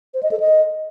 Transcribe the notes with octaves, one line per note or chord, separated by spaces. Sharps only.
C5
D#5
A4
D#5